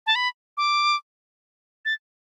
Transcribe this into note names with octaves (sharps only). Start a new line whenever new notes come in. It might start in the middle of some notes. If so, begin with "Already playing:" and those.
A5
B5
D6
A6